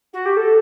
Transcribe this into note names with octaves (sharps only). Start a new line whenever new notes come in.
F#4
G4
A4